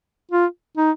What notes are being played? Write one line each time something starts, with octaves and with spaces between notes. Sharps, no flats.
F4
D#4